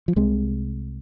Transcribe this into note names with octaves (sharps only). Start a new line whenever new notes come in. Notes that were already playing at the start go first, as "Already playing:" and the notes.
F3
C2 C3 G#3